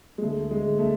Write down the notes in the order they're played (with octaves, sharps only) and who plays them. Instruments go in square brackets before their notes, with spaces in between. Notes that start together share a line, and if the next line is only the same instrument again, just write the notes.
[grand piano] G#3
D2 A3
G#3
D2
A3